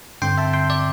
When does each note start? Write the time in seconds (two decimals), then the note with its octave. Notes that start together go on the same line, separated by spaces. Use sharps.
0.22 G2 D3 C4 G5 C6
0.38 E5 A5
0.53 G5 C6
0.70 D5